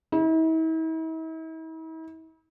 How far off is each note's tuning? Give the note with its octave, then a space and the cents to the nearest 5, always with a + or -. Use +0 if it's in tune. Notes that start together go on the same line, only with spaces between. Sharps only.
E4 -45